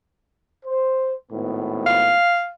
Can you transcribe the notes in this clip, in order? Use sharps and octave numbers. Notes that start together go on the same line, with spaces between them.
C5
G#1 A2 B3
F5